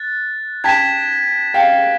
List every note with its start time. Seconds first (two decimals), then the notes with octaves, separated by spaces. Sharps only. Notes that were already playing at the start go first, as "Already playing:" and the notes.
Already playing: F#6 A6
0.64 G5 A5 G#6 B6 E7
1.54 F5 G5